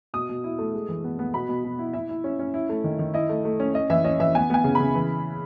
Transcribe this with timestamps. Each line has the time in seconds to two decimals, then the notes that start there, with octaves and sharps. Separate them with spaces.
0.14 B2 D#6
0.29 B2
0.44 E4
0.59 A3
0.74 G#3
0.88 E3
1.04 B3
1.19 B3
1.34 B2 B5
1.49 B2
1.64 B2
1.79 E4
1.94 E4 E5
2.09 E4
2.24 C#4
2.39 C#4
2.54 E4
2.69 A3
2.84 D#3
2.99 D#3
3.14 E4 D#5
3.29 A3
3.45 A3
3.60 C#4
3.74 C#4 D#5
3.90 E3 E5
4.04 C#4 D#5
4.20 E3 E5
4.35 B3 G#5
4.50 B3 G#5
4.64 C#3
4.75 C#3 B5
4.95 E3